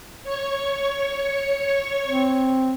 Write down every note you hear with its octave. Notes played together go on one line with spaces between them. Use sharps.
C#5 C#6
C4